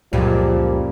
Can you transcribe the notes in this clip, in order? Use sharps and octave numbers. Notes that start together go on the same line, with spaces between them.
C#2 F#2 A#2 C#3 F3 G3